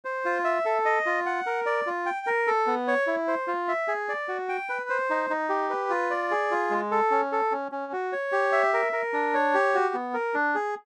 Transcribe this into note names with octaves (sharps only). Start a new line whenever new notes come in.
C5
F4
E5
A4
D#5
F4
F#5
A#4
D5
F4
G5
A#4
A4
B3
C#5
E4
C5
F4
E5
G#4
D5
F#4
G5
B4
C5
D#4
D#4
G4
B4
F4
D5
G#4
F4
G#3
A4
C#4
A4
C#4
C#4
F#4
C#5
G4
E5
A#4
A#4
D4
C#5
G4
F#4
B3
A#4
D4
G#4